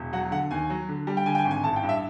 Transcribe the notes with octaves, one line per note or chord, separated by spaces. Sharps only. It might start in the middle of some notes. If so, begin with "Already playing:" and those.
Already playing: E1
F#3 F#5
D3 F#5
D#2 G#5
F#3
D3
G3
G5
D3 G#5
G5
G#5
G#1
G#5
A1 A5
G5
G2
E5